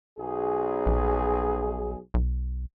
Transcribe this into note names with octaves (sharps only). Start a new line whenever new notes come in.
B1 G#4
A#1
B1